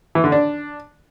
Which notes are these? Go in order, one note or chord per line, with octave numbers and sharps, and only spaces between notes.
E3
D3
D4